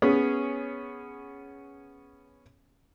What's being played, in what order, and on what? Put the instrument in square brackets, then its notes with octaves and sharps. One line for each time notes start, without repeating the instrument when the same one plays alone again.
[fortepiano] B3 C#4 G#4